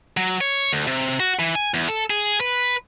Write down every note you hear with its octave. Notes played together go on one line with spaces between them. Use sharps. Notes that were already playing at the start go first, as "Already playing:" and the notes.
F#3
C#5
D2
C3
F#4
E3
G#5
E2
A4
G#4
B4